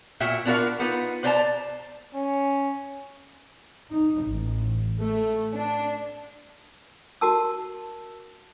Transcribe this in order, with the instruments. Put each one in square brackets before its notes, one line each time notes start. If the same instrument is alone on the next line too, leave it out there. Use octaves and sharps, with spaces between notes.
[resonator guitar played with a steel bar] A#2 F#4 E5 G5
B3 D4 F4 F#4 A#4 F5
B3 D#4 F4 B4
B4 C5 D5 G5 A5 A#5
[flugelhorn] C#4
[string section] D#4
A1
A3
D4
[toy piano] F#4 A#4 A5 E6